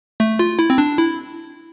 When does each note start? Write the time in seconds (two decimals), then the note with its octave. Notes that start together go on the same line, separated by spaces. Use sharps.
0.20 A3
0.39 F4
0.59 E4
0.70 C4
0.78 D4
0.98 E4